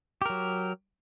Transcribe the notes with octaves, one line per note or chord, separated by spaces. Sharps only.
F#3 G4 A#4